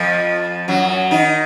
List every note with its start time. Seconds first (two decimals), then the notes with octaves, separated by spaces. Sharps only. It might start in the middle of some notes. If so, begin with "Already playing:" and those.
Already playing: F2 F3
0.68 F#2 F#3
1.11 D#3 D#4